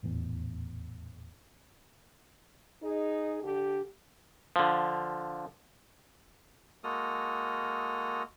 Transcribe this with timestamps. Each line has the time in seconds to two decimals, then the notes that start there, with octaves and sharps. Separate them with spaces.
0.03 D#1 A1 E2
2.83 D#4 G#4
3.43 D3 G4
4.56 D3 F3
6.84 G#3 A#3 F#4 A4 D#6 F6